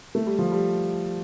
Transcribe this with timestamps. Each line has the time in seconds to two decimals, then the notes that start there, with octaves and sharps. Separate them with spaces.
0.15 A3
0.26 G3
0.39 F3
0.52 G3